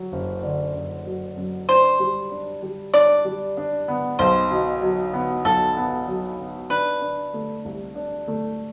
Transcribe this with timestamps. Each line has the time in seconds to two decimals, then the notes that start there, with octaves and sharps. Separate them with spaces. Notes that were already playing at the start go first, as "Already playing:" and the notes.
Already playing: F#3
0.12 F#1
0.43 D3
0.74 F#1
1.06 F#3
1.37 F#2
1.68 D4 C5
2.00 G3
2.31 D4
2.62 G3
2.93 D4 D5
3.25 G3
3.57 D4
3.88 B3
4.19 B1 C5
4.51 B2
4.82 F#3
5.14 B3
5.45 B1 A4
5.77 B3
6.08 F#3
6.39 B3
6.70 D4 B4
7.02 D4
7.34 A3
7.65 C2
7.95 D4
8.28 A3